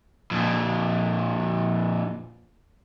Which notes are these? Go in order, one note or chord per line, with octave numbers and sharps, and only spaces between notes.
F2 A#2